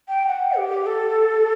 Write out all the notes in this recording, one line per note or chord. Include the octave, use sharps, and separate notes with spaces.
G5
F#5
G4
A4